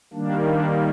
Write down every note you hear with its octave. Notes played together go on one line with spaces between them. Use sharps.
D#3 G3 A#3 D4
D4